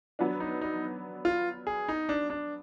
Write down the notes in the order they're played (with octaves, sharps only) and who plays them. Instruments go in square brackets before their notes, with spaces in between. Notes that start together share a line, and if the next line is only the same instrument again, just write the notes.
[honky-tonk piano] F#3 B3 D4
[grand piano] D#4
D#4
F4
G#4
D#4
D4
D4